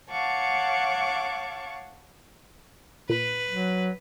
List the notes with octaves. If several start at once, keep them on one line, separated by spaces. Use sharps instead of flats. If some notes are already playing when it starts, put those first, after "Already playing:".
C#5 F5 F#5 A5 C#6 D6
A#2 B4
F#3